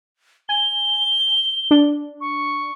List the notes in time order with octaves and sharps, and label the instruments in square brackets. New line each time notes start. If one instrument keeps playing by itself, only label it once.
[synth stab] G#5 [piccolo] G7
[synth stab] D4
[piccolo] C#6